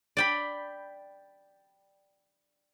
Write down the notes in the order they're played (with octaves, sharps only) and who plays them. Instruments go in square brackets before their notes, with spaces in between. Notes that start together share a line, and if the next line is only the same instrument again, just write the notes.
[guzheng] D5 G5 B5